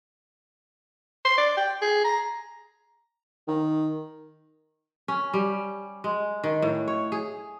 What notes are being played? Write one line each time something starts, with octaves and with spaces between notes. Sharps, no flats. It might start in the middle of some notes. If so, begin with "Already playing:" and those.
C6
D5
G5
G#4
A#5
D#3
C#4
G3
G#3
D#3
A2
C#5
G#4